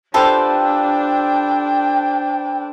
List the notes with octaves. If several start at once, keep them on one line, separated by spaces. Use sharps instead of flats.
D4 F4 G4 A4 B4 C5 G5 A5